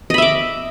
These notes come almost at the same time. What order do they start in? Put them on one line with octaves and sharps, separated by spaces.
D#5 B5 E5 D6